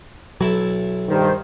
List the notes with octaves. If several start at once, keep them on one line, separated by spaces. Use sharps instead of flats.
B1 F#3 E4 A5
G2 D#3 C5